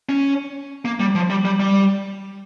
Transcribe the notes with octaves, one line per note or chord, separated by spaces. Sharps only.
C#4
A#3
G3
F3
G3
G3
G3